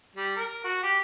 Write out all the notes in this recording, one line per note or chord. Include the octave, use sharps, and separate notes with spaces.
G3
A#4
F#4
G4